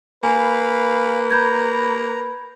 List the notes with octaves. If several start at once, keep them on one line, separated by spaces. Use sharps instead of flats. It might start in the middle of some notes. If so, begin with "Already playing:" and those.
A#3 B4 F5 G#5 B5
A#5 B5 G6 G#6